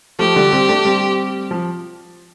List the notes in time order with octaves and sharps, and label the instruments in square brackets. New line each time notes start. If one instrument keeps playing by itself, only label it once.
[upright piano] F3 A3 [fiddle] G4
[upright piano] D3 G3
G3 C4
A3 D4
G3 C4
F3